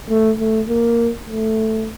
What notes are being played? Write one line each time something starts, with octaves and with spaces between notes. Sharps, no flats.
A3
A3
A#3
A3